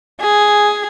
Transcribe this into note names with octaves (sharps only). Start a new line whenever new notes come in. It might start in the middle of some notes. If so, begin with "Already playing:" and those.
G#4